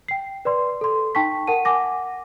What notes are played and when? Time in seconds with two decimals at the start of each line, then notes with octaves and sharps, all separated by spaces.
0.08 G5 C7
0.45 B4 D5 C6
0.81 A4 C6
1.15 D#4 G5 A5 C#6 B6
1.47 A#4 F#5 A5 D#7
1.65 F#5 G#5 D6 A#6